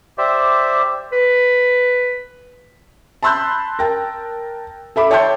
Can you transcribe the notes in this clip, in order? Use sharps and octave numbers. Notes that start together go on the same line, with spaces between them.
G4 C5 D5 E5
B4
A5 B5 C6 E6 F#6 G6
A#4 G5 A5
A4 E5 B5 D6
C#5 E5 G5 A5 C6 G6